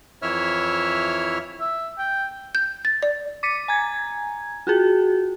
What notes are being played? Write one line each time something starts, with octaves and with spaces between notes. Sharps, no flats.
F2 E3 E4 C#5 E5 F6
E5
G5
G6
A6
D5
D6 A6 B6 C#7 D#7
G#5 A#5 G#6
F4 F#4 G#4